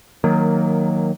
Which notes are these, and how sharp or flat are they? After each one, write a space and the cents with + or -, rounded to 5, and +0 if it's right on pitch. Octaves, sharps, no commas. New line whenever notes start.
D#3 +0 F#3 -15 A#3 -10